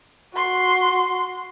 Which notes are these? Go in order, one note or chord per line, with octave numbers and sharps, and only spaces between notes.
F#4 C6